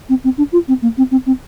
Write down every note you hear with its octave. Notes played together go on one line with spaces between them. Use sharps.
C4
C4
D4
F4
C4
A#3
C4
C4
C4